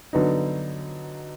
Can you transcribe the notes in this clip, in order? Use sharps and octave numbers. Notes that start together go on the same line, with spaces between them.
D3 F#3 B3 D#4